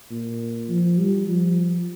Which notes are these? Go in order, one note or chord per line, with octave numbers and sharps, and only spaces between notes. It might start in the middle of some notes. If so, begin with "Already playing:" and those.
A#2
F3
G3
F3